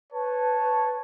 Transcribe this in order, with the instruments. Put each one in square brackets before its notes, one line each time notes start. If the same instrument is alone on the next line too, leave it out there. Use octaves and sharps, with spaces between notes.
[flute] B4 [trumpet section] C#5 A5